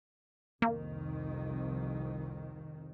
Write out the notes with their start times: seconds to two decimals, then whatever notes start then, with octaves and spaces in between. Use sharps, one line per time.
0.62 C2 F2 D#3 A#3